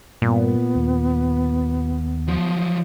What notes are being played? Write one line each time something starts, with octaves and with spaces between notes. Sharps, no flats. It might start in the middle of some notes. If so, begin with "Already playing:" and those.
G2 A#2 B3
D#2
F3 F#3